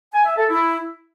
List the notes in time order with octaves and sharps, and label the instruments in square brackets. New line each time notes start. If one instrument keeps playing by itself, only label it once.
[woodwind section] G#5
E5
A4
E4